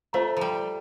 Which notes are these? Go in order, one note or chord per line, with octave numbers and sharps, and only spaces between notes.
A3 F4 C5 F5 A#5
F3 G3